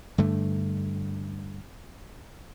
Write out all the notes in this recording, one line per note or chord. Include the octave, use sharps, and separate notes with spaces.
G2 D3 A3